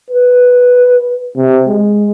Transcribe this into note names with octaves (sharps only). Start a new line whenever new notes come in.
B4
C3
G#3